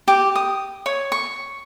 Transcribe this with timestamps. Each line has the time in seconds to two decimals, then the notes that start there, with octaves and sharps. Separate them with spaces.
0.08 G4
0.35 D#6
0.86 C#5
1.12 C#6